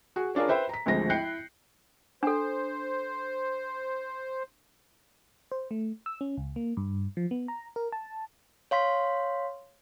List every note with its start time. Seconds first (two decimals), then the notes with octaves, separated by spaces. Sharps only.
0.16 F#4 G#4
0.35 C#4 D4 F4 G#4 A#4
0.48 B4 C5 E5 G5 B5
0.69 A#5 B6
0.86 G#1 D2 F3 G#3 C4 A#6
1.10 E4 G5 F#6 G6 C7 C#7
2.23 D4 A4 C5
5.52 C5
5.71 A3
6.06 E6
6.21 C#4
6.37 C#2
6.56 A#3
6.77 G2
7.17 F3
7.31 B3
7.48 A#5
7.76 A#4
7.92 A5
8.71 C#5 F5 C6 B6